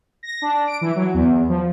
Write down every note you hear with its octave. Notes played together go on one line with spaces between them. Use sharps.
A#6
D4
D7
E3
F#3
E2
F3